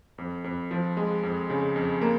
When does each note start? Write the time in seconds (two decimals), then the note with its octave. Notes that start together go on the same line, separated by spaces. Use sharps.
0.18 F2
0.44 F2
0.71 F3
0.97 G#3
1.23 F2
1.50 C#3
1.76 F2
2.01 A#3